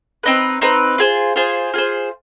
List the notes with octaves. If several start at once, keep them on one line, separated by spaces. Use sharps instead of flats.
C4 D#4 B4
C4 D#4 B4
F4 G#4 C5
F4 G#4 C5
F4 G#4 C5